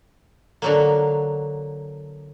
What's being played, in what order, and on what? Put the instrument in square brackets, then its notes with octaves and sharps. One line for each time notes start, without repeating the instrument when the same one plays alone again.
[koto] D3 F#3 A#3